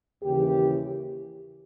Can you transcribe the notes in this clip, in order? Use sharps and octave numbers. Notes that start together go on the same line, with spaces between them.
D#2 C#3 E3 G4